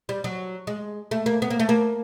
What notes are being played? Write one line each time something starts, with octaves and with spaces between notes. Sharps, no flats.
G3
F#3
G#3
A3
A#3
B3
A#3
A3
A#3